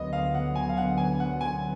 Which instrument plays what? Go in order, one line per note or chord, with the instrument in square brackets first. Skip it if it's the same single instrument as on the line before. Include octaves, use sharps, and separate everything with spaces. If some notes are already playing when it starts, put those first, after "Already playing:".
Already playing: [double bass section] D2 D3 F#3 B3 [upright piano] D#5
[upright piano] F5
F#5
G#5
F5
F#5
G#5
F#5
G#5